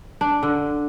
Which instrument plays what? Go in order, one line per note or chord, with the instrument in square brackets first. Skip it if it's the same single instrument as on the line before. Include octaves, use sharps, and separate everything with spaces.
[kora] D4
D3